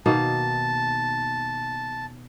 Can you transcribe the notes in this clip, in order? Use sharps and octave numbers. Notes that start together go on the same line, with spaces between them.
B2 D#3 A#3 A5